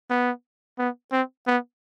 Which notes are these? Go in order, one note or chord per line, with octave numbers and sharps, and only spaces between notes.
B3
B3
C4
B3